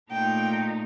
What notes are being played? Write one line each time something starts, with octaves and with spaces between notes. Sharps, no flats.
A#2 A3 D#4 G5